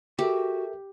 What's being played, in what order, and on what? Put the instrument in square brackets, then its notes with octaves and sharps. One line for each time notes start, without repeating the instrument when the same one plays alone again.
[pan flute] F#4 [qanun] G4 [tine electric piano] A4 A#4 E5